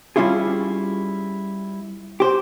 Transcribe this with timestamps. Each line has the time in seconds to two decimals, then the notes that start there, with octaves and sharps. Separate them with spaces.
0.16 G3 C#4 E4 F4 G#4
2.20 G4 C5